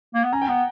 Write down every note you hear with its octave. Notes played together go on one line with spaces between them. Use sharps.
A#3
B3
C#4 A#5
G5
B3 F#5